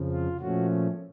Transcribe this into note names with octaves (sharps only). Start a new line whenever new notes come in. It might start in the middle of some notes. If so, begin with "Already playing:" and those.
Already playing: F2 C#3 F3
F4
A#2 F3 A3 C#4 F#4